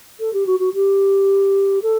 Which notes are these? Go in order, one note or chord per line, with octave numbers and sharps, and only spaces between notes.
A4
G4
F#4
F#4
G4
A4